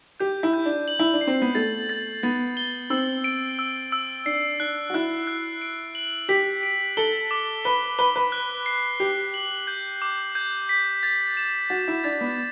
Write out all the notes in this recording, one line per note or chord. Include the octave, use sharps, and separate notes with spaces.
G4 G6
E4
G6
D4
F#7
E4
D4
C7
C4
B3
A3 A6
A6
B3 A6
G7
C4 E6
D7
E6
E6
D4 C7
D4 F#6
F#4
E4 F#6
F#6
D7
F#7
G4 B6
D7
A4 G7
D6
B4 G7
B4 G7
B4
F#6
C7
G4 C7
F#7
G6
D6
G6
B6
A6
E7
F#4 A6
E4
D4 A6
B3